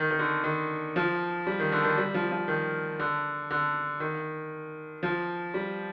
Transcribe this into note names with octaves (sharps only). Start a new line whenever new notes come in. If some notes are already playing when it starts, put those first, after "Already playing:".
Already playing: D#3
D#3
D3
D#3
F3
G3
D#3
D3
D#3
G3
F3
F3
D#3
D3
D3
D#3
F3
G3